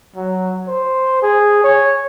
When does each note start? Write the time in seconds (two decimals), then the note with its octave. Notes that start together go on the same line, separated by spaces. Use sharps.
0.16 F#3
0.68 C5
1.23 G#4
1.64 C#5